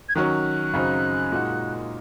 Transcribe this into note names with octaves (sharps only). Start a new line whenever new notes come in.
G#6
D#3 F#3 C#4 F#6
F#2 C#3 F#3 C4 D#4
A#2 G#3 D#4 F#4